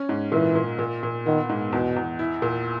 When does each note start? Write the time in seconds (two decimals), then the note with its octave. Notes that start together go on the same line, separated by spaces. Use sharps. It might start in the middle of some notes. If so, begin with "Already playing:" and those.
Already playing: C#4
0.09 G#2
0.32 A#2 E3
0.55 A#2
0.79 A#2
1.03 A#2
1.26 D#3 B3
1.49 G#2
1.72 E2 B2
1.96 E2
2.19 E4
2.42 A#2